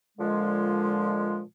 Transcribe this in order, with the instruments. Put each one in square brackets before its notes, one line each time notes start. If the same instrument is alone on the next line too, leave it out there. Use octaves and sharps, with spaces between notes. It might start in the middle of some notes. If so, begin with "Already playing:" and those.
[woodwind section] A#2 D3 F3 G#3